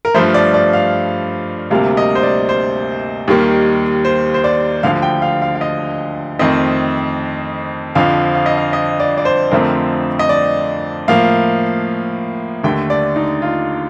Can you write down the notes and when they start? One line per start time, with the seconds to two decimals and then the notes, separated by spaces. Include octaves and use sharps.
0.05 A#4
0.14 G2 F3 A3 C5
0.34 D5
0.54 D5
0.73 F5
1.71 D2 C3 G3 A#3 F5
1.97 D#5
2.15 C5
2.23 D5
2.49 C5
3.28 D#2 D#3 G3 A#3
4.05 C5
4.34 C5
4.44 D5
4.83 D2 D3 F3 F5
5.02 G5
5.22 F5
5.42 F5
5.55 F5
5.61 D#5
6.39 F2 D#3 A3 C4 D#5
7.95 F2 D3 F3 F5
8.35 F5
8.46 D#5
8.57 F5
8.73 D#5
9.00 D5
9.18 D5
9.25 C5
9.51 F2 D3 F3 A3 C4 A#4
10.19 D#5
10.29 D5
11.08 A2 F3 A#3 F5
12.63 D#2 D3 A3 G5
12.90 D5
13.16 D#4
13.42 F4